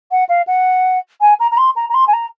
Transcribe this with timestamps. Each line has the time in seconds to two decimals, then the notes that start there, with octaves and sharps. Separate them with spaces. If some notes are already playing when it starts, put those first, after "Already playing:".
0.11 F#5
0.29 F5
0.47 F#5
1.21 G#5
1.40 A#5
1.52 A#5
1.58 C6
1.76 A#5
1.90 A#5
1.94 C6
2.07 G#5
2.13 A#5